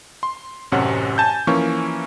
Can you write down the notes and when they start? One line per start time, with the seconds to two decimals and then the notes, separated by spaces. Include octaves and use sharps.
0.23 C6
0.72 A1 F#2 C3 C#4 F#5
1.18 G#5 A5 G6
1.47 E3 F3 A#3 C#4 C#6